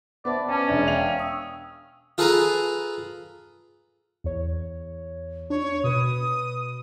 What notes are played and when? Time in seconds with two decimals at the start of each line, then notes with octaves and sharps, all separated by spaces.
0.25 B3 C5 D5 E5 A5
0.49 C#4 E5 A5
0.68 E1 D4
0.88 F5 G5 F7
1.18 C#6 D#6 E6
2.18 F4 G#4 A4 B4 G#5 A#5
4.24 E2 C#5
5.50 D4 C#5
5.84 B2 B4 D#6